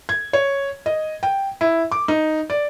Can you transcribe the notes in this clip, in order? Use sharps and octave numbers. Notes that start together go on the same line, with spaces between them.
G#6
C#5
D#5
G5
E4
D6
D#4
D5